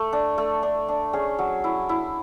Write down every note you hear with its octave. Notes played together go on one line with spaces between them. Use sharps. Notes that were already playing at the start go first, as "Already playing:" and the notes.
Already playing: A3
D4
A3
D4
D4
C#4 G#4
F#3
E4
E4